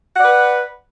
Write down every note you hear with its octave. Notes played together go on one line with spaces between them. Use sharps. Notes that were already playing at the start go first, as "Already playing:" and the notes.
B4 D5 F#5